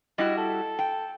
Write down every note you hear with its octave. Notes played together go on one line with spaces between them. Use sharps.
G3 E4 F#4 D#5
A4
G5